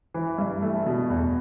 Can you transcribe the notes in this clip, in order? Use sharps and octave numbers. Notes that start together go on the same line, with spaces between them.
E3
G2
A3
B2
E2